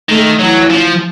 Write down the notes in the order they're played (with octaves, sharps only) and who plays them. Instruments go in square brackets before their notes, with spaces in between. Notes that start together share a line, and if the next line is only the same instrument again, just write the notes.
[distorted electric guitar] D#3 [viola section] A3
[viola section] E3 [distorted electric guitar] F#3
[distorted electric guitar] F3